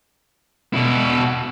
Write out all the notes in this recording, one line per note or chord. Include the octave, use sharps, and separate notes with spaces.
B2 E4